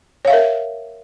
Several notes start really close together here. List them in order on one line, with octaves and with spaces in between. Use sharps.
C#5 F5 E5 A#4